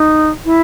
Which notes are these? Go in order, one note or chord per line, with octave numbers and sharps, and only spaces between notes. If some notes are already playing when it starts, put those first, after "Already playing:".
Already playing: D#4
E4